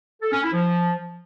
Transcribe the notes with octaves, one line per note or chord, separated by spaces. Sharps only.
A4
C#4
E4
F3